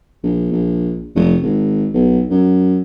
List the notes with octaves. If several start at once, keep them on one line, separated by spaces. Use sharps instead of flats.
A#1
A#1
F1
G#1
B1
F#2